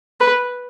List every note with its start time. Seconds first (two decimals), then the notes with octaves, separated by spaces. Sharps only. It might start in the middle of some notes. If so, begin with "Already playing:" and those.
0.20 B4